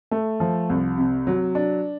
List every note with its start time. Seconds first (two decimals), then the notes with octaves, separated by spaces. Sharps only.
0.11 A3
0.40 F3
0.70 C2
0.98 C3
1.27 F#3
1.55 D4